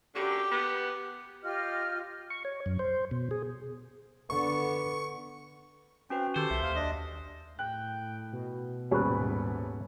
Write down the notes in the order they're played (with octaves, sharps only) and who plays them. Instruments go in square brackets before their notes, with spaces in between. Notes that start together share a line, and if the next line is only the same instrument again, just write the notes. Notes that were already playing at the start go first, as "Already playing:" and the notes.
[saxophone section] F#2 D3 [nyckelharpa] G4
[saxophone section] B3
[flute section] F4 G4 D#5 F6
[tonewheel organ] C#6
C#5
F#2
C5
B2
G#4
[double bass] D3 B3 [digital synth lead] C#6
[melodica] C4 [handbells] C#4 F#4 B4
[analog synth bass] D#3 [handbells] G4 [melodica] A4 [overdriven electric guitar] C5
[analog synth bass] C2 [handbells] E5
[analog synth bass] D#2 [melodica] F5
[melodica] D4 D#5
[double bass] A2 [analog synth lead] G5 [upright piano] F#6
[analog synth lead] B2
[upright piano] D#1 G3 G#4 [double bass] G#2 B3 [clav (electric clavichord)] C#4 B4